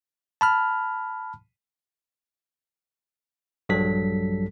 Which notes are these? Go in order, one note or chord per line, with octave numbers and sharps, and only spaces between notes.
A5 B5 F6
A#1 G2 F#3 G3 A4 B6